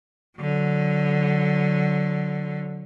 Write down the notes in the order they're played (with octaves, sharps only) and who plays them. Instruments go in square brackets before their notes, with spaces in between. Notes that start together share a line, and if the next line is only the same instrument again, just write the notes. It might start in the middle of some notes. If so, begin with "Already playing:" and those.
[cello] D3 F#3